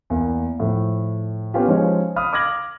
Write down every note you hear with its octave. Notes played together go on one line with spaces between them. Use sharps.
E2 A#3
A2 F3
B3 C#4 F4 G4
F3 G#3 C#4 D#4 C#5
F5 B5 D#6 F6
D6 F6 G#6 A#6 F#7